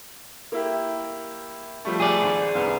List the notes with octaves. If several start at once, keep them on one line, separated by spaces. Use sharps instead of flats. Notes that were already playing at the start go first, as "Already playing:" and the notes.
A#3 E4 G4
F3 G3 A3
G#4 D5
G#1
F#1 C2 B3